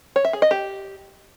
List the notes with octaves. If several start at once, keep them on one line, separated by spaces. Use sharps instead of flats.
C#5
E5
G#4
D#5
G4